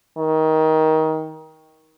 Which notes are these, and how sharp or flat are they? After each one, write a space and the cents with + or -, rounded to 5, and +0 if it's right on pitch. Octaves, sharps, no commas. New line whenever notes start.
D#3 +20